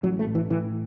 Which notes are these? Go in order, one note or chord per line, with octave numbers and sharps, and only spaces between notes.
A1 F#3
A3
A2
E3
A2 E3